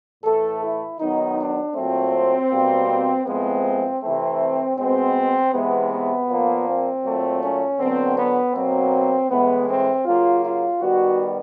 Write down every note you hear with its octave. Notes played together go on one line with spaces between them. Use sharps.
A2 E3 A3 A4
E4
D#3 F#3 B3 D#4
D4
A#2 F#3 A3 C4
B2 G3 A#3
A2 F3 G#3 B3 C4
C3 E3 A3 C4
B2 G#3 B3 C4
C3 E3 G#3 B3
B3
A#2 F3 A#3
C4
A#2 F#3 A3
C#4
D3 F#3 B3 C4
B3
B2 F#3 A#3 C4
A2 E3 G#3 B3
C4
C#3 F#3 A#3 F4
F4
D#3 G3 B3 F#4